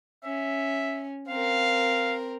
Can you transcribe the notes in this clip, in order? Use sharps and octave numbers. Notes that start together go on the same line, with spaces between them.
C#4 E5
C4 A#4 F5